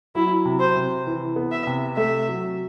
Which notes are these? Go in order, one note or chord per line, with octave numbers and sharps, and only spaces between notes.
F#3 E4
C3
C5
C3
E3
B3
E5
C3
A3 E5
F#3